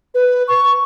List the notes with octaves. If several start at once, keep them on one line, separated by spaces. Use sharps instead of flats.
B4
C#6